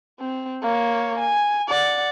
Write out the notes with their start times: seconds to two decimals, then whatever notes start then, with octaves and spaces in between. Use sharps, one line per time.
0.19 C4
0.63 A#3 C#5
1.19 G#5
1.68 D5 F#5